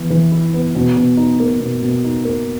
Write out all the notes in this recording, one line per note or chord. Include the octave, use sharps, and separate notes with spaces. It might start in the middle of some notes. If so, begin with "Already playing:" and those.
Already playing: E3 B3
E3
E4
B3
B2
B2
D#4
A#3
B2
B2
D#4
A#3